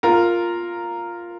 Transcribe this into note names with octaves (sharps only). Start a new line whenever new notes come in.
F4 A#4